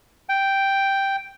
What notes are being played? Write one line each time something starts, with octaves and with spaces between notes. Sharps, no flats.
G5